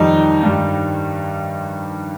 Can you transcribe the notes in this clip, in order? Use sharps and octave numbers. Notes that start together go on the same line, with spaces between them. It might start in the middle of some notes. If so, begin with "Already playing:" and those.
Already playing: F2 D#3 G3 D#4
G2 D#3 G3